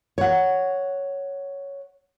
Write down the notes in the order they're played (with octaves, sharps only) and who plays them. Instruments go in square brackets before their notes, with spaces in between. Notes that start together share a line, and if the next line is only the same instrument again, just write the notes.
[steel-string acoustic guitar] C#5 F#5